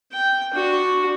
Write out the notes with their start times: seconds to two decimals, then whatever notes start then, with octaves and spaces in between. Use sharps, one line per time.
0.12 G5
0.53 D4 F#4